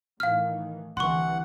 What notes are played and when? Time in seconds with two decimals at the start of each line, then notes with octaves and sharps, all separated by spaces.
0.20 A2 D#3 E3 F5 F6
0.97 C2 D3 E3 F#5 C6 C#6